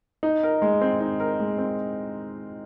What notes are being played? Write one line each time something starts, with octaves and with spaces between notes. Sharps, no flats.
D#4
A#4
G#3
C4
D#4
A#4
G#3
C4